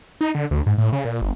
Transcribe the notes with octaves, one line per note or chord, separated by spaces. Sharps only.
D#4
D3
D2
G#2
A2
C#3
A#2
G1